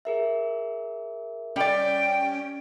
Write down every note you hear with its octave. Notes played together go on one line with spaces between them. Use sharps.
G#4 A#4 E5
G3 C#4 D5 G5